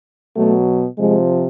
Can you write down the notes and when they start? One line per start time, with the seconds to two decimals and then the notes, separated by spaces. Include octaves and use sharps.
0.36 B2 F#3 A3
0.97 C3 F3 G#3